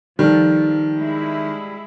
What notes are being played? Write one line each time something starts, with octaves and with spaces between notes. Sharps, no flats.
D#3 F3 G3 A4
G#3 E4